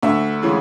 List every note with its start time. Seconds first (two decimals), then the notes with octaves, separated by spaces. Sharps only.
0.02 D2 E5
0.42 C#3 E3 G#3